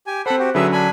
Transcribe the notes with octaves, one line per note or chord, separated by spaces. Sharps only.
G4 G#5
C4 A4 C5 F#5 B5
F#4 G4
D3 F#3 C#4 G#4 B4 E5
D4 G#5 B5